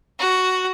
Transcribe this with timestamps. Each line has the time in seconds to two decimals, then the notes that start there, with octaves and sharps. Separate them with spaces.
0.19 F#4